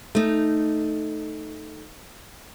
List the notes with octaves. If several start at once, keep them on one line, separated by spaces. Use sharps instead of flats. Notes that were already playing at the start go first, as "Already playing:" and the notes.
A3 D#4